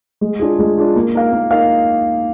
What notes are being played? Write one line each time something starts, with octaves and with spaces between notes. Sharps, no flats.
G#3
D4 F4 G#4
G#3
D4 F4 G#4
A#3
D#4 A#4 F5
A#3
D#4 A#4 F5